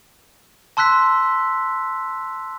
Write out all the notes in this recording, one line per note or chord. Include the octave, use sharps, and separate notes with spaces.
A5 C6 E6 F#6 B6